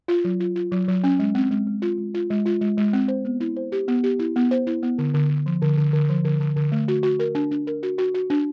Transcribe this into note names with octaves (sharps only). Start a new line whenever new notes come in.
F4
F#3
F4
F4
F#3
F#3
C#4
G#3
C4
G#3
G#3
F4
G#3
F4
G#3
F4
G#3
G#3
C4
C5
B3
E4
C5
G4
B3
G4
E4
B3
C5
E4
B3
D3
D3
D3
F3
D3
D3
D3
F3
D3
D3
D3
A3
F#4
F#4
A#4
D4
D4
A#4
F#4
F#4
F#4
D4